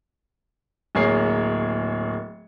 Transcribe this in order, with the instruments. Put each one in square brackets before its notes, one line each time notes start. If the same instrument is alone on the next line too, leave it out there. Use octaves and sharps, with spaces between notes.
[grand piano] D1 A#3 G#4 C#5 C7